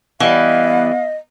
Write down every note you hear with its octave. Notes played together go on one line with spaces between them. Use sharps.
E3 G3 B3 D#5 F5